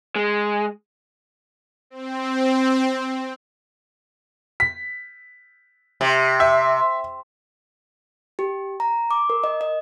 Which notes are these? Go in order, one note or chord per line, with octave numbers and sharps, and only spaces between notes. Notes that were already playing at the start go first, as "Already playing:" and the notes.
G#3
C4
B6
C3
E5
G4
A#5
D6
A#4
D#5
D#5